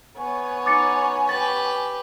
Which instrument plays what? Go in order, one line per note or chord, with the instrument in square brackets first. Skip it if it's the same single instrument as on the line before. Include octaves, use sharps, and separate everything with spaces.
[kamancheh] B3 C#5 [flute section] G#5 C#6
[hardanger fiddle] D#4 [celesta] D6 A6 C#7
[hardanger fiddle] G4 B4 [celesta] A6